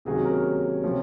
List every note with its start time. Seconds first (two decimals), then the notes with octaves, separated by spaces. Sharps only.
0.05 C3 D#3 F#3 A#3 C#4 G#4
0.25 A#4
0.83 C3 F3 A#3 C#4